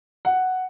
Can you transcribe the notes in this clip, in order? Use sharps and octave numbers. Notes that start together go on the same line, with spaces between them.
F#5